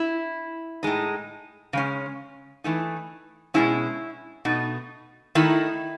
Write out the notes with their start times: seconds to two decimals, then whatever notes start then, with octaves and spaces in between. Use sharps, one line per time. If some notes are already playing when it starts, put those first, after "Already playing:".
Already playing: E4
0.83 A2 G#3 D#4
1.73 C#3 G#3 C#4
2.64 E3 A3 D#4
3.54 B2 G#3 C#4 E4
4.45 B2 A3 D#4
5.35 D#3 A3 D#4 E4